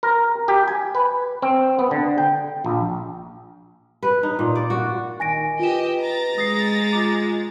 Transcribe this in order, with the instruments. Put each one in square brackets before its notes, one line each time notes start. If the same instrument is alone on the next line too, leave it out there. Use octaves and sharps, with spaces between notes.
[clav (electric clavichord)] A#4
G4
G#5
B4
C4
B3
D3
G5
A#1
[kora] B4
D#4
A#2
D5
F#4
[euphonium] D#3 [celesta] G#5 A#6 D7
[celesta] F4 E7 [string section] G4 D#5 [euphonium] B4
[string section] A#5 A6
[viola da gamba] G#3 [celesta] D#6 A#6 C7
[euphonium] F4 [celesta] D6